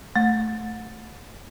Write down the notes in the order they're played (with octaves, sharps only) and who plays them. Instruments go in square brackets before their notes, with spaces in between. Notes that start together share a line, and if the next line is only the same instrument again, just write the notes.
[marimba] A3